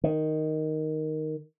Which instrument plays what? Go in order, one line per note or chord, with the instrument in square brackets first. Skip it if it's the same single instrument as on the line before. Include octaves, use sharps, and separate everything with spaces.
[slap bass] D#3